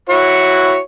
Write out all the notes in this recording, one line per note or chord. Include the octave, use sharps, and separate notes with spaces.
E4 F#4 C#5